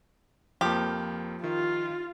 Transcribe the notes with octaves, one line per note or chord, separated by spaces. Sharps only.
F2 F3 A#3 G4
D#3 F4